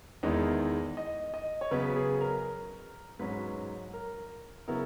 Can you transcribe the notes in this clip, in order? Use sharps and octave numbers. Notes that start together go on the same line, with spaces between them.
E2 D#3 G#3 B3 E4 D#5
D#5
D#5
C#5
C#3 F#3 B3 B4
G#4
A#4
G#2 F#3 C#4 B4
A#4
C#3 F#3 B3 E4 A#4